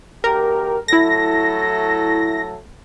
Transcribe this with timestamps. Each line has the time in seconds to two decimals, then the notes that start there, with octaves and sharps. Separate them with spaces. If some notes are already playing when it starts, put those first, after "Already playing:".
0.24 D2 G4 A#4
0.88 F#3 A3 E4 A4 A#6